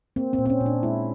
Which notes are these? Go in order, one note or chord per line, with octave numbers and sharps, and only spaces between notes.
A#3 C4
C4
A#2
C4
C#4
A#2
D4
G#3 E4